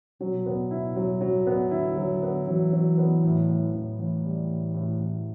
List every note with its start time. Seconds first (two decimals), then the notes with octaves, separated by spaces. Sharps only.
0.21 B2 F#3
0.46 B3
0.71 E4
0.96 F#3
1.21 F#3
1.47 B3
1.71 D3 E4
1.96 F#3
2.23 B3
2.48 E3 F#3
2.73 F#3
2.98 B3
3.23 A2
3.48 A2
3.73 A2
3.99 A2 E3
4.24 G3
4.50 A2
4.74 A2
4.99 A2